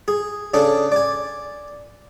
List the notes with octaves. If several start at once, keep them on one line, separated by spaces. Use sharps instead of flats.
G#4
C#3 D4 G#4 A4
D5 G#5